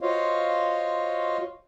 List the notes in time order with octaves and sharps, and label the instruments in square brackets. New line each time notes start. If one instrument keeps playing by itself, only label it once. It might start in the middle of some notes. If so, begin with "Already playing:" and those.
[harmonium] F4 F#4 C5 C#5 D#5 F5